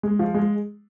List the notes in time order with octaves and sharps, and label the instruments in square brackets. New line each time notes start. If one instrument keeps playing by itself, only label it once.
[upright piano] G#3
F3
G#3